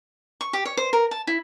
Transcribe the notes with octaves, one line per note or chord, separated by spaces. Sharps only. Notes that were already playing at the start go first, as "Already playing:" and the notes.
C#6
G4
C#5
C5
A#4
A5
E4